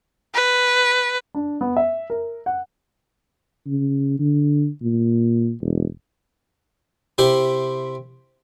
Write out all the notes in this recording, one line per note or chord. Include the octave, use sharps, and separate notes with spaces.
B4
D4
B3
E5
A#4
F#5
C#3
D3
A#2
E1
C3 E4 G4 C5 B5 C6